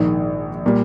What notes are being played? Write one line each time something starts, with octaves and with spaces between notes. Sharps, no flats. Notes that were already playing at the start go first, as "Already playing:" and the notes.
Already playing: A#1 G#2 D#3
A#2 G3